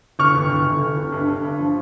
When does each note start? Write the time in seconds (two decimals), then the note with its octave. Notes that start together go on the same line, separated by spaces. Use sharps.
0.19 G1 C#6 F6
0.34 G1
0.50 G1
0.66 G1
0.82 G1
0.97 G1
1.12 G2
1.28 G2
1.43 G2
1.59 F3